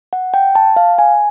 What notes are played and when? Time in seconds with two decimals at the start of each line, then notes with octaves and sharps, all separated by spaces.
0.13 F#5
0.34 G5
0.55 A5
0.76 F5
0.99 G#5